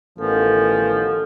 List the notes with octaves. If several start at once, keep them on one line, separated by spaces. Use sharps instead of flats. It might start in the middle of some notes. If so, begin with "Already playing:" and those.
A1 D#3 F3 B3 C#4 A4